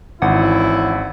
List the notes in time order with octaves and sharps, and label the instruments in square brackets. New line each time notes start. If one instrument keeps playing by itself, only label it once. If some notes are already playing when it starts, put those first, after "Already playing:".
[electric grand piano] G#1 [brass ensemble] E3 C#4 E4 [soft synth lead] F#5